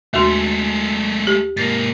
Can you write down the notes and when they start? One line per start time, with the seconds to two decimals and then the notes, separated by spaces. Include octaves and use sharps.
0.14 D#2 G#3 A3 F#4 C6
1.27 G4
1.57 G#2 A#3 A6